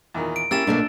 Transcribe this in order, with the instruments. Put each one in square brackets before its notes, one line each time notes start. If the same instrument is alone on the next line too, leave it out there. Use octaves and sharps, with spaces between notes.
[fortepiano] E2 A#2 D#3
[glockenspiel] D7
[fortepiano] A#3 E4 [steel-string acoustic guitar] C#4 G4 [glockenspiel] E6 A6 E7
[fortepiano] A#1 [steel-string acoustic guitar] B2 A3 A#3 [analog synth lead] D4